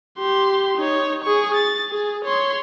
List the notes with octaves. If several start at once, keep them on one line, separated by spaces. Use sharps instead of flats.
G4 C6
D#4 C#5
G#4 C#6
A6
G#4
C#5 C6